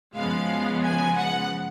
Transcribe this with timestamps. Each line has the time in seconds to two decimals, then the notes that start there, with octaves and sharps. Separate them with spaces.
0.15 F#2 C#3 F3 G#3 B3 F5
0.83 G#5
1.16 F#5